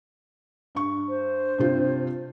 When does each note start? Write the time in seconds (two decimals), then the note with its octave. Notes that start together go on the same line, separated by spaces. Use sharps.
0.75 G2 C#6
1.08 C5
1.58 G2 C3 F4